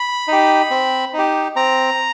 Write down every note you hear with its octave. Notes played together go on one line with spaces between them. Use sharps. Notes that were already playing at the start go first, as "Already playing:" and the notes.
Already playing: B5
D#4 G4
C4
D#4
G4
C4 A#5